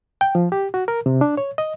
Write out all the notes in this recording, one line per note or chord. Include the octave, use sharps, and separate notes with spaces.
G5
F3
G4
F#4
A#4
C3
D4
C#5
D#5